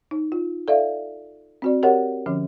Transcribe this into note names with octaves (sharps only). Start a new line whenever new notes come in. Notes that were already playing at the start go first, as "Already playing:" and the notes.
D#4
F4
A4 D5 E5 F5
C4 F#4 D5
G4 A#4 C#5 D#5 F#5
D3 F3 C#4